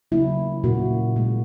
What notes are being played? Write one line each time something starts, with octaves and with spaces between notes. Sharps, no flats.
C#3 F#3 A#3 E4
A#2 A#3 F#4
A#2 G#3